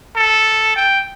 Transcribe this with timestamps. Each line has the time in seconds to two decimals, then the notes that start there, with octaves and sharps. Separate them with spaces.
0.16 A4
0.76 G5